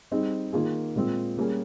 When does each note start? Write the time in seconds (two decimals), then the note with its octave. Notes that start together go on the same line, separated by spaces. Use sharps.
0.11 G3 C4 D#4 G#4
0.53 D#3 A#3 F4 G#4
0.96 A#2 G#3 C4
1.37 G3 A#3 C#4 G#4